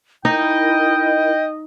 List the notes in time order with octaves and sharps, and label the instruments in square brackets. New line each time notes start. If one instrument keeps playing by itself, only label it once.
[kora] D#4 [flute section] E4 A#4 [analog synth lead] D#5 [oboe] G5